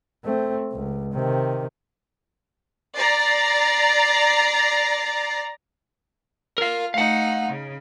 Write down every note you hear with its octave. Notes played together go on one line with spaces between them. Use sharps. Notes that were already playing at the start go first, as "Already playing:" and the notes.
A3 C4
C#2
C3 D#3
D5 A#5 A6 C7
F4 A#4 F5
A3 D#4 F5 F#5
C#3